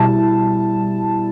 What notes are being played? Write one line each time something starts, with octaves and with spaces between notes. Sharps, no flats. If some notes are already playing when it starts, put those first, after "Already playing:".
Already playing: B2 G3 E4 A5